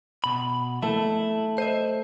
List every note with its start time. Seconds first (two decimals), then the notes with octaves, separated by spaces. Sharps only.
0.24 B2 B5
0.82 A3 E4
1.58 C5 D#5 E5